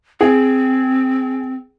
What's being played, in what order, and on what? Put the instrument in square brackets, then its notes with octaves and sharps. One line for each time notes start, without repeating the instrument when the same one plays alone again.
[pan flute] C4 [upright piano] G#4